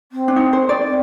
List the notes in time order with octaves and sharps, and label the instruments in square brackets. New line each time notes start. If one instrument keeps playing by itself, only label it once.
[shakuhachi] C4
[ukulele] D4
D#4
C5
D5
[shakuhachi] C4